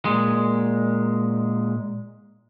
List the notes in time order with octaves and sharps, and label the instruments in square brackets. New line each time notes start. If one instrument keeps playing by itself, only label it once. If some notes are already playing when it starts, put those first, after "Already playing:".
[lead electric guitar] A#2 G#3